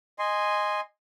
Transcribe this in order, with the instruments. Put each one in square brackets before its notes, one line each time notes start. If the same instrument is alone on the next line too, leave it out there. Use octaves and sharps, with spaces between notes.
[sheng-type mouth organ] D#5 G#5 C6